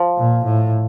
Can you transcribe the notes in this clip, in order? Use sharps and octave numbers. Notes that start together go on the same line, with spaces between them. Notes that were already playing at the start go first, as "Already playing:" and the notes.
Already playing: F3
A#2
A2